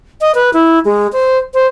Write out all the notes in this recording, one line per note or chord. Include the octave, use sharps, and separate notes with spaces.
D#5
B4
E4
G#3
C5
C5